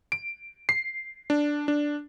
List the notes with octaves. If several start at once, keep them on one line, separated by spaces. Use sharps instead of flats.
D7
C7
D4
D4